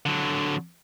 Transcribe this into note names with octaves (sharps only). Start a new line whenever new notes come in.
D3 F#3